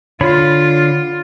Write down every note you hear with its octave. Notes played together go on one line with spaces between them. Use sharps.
D3 F4 C#5 B5